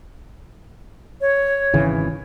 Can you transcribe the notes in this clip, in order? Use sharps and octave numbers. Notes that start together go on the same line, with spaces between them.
C#5
G#1 C#3 E3